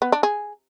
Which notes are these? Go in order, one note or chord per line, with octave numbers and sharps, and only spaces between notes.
B3
D4
G#4